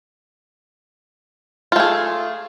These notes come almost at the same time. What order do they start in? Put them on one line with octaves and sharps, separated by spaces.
F4 A3 G#4